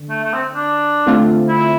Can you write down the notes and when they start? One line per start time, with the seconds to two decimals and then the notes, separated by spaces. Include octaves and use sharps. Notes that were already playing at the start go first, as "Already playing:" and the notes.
Already playing: D3
0.09 A3
0.24 A3
0.33 C4
0.55 D4
1.06 D3 A3 C4 F4
1.48 E4